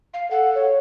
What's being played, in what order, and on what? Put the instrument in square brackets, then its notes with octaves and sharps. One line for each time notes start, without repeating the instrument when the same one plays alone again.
[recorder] F5
[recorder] A4 [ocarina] F#5
[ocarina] C#5